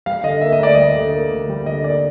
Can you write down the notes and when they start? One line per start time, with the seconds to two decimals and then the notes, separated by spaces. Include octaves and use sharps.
0.06 G3 F5
0.24 D3 D#5
0.41 A#3 E5
0.52 D#5
0.59 D2 D5
0.75 G3 D#5
0.95 D3
1.13 A#3
1.31 D2
1.49 G3
1.66 D3 D#5
1.84 A#3 D5